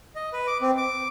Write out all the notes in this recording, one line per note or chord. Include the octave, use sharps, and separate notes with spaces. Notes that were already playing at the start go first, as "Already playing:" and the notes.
D#5
B4
D6
C4
D6